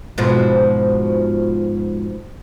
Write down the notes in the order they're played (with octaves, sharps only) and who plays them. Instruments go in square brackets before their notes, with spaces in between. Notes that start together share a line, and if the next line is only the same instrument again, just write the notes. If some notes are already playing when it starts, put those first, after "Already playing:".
[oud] G#2 B2 F3